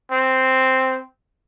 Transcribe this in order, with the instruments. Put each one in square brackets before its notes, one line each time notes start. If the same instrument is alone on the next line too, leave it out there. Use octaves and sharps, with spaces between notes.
[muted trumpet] C4